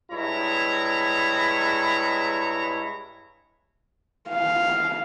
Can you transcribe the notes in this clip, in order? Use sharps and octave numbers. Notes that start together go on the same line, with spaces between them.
G2 G#3 E4 C#5 A#5
F5